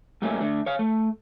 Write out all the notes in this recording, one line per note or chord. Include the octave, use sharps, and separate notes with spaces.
G#2 G3 A3 A#3 C#4
D3 A3
C#5 F5
A3